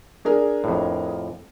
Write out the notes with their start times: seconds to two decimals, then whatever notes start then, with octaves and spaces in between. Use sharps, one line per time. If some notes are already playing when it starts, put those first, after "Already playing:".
0.25 D4 G#4 A#4
0.64 F2 A2